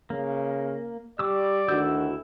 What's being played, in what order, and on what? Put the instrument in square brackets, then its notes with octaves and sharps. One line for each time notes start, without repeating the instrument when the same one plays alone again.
[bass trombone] C#3 [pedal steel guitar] A#3
[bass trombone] G3 [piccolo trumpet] D5 [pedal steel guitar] C#6 D6 E6
[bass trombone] D2 [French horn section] D3 D#3 F#4 [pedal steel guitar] E4 E6 G6